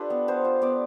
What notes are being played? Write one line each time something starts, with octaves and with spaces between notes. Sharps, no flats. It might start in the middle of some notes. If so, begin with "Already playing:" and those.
Already playing: D4 F4 G4 A4 B4
B3
B3 C5
F4
B3 D5